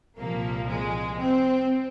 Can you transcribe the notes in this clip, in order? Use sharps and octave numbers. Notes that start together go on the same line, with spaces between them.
C2 A#2 F3 A#3
G#3
C4